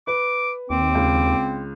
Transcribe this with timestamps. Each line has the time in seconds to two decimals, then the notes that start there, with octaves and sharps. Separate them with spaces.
0.07 B4 D6
0.70 D#2 C4 D6
0.95 C#2